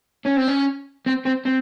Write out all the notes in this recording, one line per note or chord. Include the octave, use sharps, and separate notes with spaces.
C#4
C4
C#4
C4
C4
C4